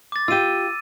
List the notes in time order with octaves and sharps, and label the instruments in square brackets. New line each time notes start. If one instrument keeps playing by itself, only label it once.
[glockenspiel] D6 A6
[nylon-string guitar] F4 G4 [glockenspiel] E6 D#7